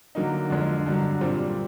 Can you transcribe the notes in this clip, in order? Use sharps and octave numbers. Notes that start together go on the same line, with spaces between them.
D3 F#3 A#3 D#4
F2 D3 F3 G#3
G2 D3 F#3
A#2 G3 C4